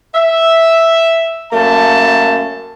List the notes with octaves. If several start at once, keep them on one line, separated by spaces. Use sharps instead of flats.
E5
F#2 A3 A#3 A5